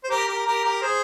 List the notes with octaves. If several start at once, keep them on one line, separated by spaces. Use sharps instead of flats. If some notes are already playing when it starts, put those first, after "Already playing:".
C5
G4 A#4
G4 A#4
G4 A#4
G4 A#4
G#4 C5